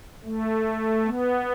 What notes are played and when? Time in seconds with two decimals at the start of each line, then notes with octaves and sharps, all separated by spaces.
0.25 A3
1.05 B3